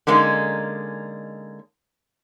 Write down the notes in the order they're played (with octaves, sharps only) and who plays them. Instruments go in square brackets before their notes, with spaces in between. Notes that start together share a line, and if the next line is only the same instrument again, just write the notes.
[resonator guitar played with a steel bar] D3 G#3 A#3 C#4 D#4